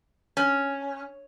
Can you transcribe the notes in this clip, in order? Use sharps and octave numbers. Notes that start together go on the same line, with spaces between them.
C#4